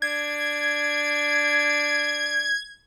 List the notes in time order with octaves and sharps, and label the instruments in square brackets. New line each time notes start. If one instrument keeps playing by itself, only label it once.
[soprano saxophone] D4 [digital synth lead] G#6